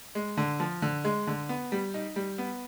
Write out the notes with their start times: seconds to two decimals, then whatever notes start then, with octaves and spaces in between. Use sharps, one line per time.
0.15 G#3
0.37 D3
0.60 F3
0.82 D3
1.05 G#3
1.27 D3
1.49 B3
1.72 G3
1.94 D#4
2.16 G3
2.38 B3